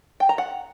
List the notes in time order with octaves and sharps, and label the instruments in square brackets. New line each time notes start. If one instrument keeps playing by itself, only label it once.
[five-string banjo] G5
A#5
F#5